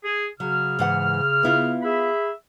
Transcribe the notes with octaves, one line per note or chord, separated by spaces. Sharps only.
G#4
C#3 F#3 F6
G#2 E3 F#5
B3 E4 F4
G#4 E5 B5